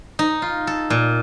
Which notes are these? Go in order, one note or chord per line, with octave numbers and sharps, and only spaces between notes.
D#4
F4
A4
A#2